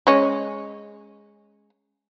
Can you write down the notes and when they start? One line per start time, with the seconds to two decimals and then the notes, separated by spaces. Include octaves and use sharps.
0.07 G#3 C#4